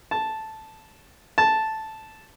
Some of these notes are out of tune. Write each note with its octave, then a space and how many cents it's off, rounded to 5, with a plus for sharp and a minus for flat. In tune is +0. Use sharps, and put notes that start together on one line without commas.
A5 -5
A5 -5